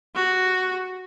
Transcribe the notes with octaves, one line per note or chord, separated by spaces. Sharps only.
F#4